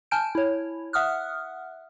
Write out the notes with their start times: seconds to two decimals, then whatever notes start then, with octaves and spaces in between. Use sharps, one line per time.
0.11 G#5 A5 F6 G6 D7
0.35 E4 C#5
0.93 E5 F#5 D#6 F6 F#6